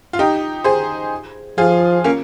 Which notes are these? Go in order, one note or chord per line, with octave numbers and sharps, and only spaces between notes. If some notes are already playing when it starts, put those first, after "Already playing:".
F4
D#4 G4
G#4 C5
F3 F4 G#4
A#3 C#4